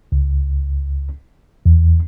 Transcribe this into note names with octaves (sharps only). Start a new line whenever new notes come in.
C#2
E2